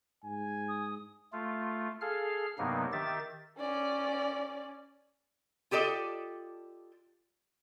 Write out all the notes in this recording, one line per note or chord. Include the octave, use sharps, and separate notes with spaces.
G#2 G#5
D#6
A3 F4
G#4 A4 F5 F6
G2 C3 F#3 A#3 B3 D#4
D#3 G4 E5 A6
C#4 D5
F4 G4 A4 D5 D#5